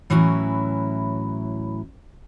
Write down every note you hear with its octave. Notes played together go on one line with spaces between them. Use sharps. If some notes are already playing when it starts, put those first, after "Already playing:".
A2 E3 F#3 C#4 E4